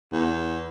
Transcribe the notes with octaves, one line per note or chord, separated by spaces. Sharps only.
E2